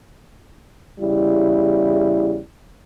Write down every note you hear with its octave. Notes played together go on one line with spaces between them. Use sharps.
E2 C#3 G3 E4